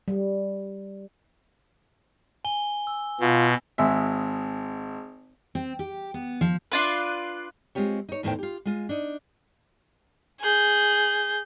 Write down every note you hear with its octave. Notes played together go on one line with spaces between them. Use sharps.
G3
G#5 G7
E6
B2 F4
G#1 G#3 E5
C4
G4
B3
F3
D4 F4 B4
G#3 C4 F4 G4 C#5
D#4 C#5
E2 A2 D#3 E4 C5 G5
F4 G4
G#3 F4
D4 D#4
G#4 G6